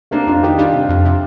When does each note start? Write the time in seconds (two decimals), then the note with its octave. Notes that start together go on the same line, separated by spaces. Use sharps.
0.11 C3 A#3 D4
0.27 F2 D4 F4
0.43 D#3 D#4 G4
0.58 G3 D4 F4
0.73 C3
0.89 F2
1.04 C3